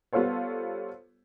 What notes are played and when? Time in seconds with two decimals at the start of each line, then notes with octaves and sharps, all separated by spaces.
0.13 G3 B3 F4 A4 C5 C#5